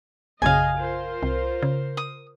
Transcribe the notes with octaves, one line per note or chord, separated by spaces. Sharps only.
A#1 F#2 C#3 G#4 D#5 F5 G#5
F4 A#4 C5
C2
C#3
D#6